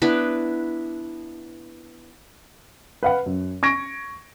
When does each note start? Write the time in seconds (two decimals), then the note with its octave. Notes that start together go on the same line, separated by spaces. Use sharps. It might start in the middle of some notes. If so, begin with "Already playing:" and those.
0.02 B3 D4 E4 B4
3.03 B4 F5 F#5
3.26 F#2
3.63 C#6 G#6 A#6 D7